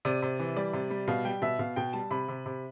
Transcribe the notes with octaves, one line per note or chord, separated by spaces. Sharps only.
C3 D5
C3
E3
G3 D5
C3
G3
B2 F5
G3 G5
B2 E5
B2 F5
B2 G5
G3 A5
C3 B5
C3
C3